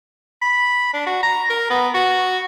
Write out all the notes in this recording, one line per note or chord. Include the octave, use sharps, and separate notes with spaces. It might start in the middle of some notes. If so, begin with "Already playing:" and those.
B5
D4
F#4
A#5
A#4
B3
F#4